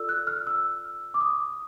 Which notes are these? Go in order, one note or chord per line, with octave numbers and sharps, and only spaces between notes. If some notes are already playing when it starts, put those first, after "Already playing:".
Already playing: F4 A4 D5 E6
F#6
F6
E6
D6
D#6